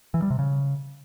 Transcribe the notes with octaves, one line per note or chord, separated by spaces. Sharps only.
E3
G3
C3
C#3